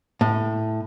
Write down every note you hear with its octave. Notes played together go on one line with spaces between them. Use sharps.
A2